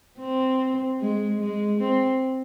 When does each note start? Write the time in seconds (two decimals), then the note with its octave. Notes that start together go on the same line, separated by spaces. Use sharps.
0.20 C4
1.01 G#3
1.41 G#3
1.80 C4